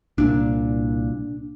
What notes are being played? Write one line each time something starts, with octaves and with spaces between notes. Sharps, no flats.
C2 A#2 D4